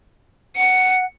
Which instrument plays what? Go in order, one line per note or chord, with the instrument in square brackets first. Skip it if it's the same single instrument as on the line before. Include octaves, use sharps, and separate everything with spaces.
[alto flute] F#5 [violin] C#7